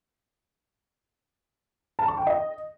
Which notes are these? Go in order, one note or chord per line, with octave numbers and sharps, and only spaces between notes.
A5
C#6
G5
D#5